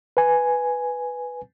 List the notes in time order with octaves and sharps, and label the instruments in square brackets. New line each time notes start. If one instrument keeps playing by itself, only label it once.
[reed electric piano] B4 G#5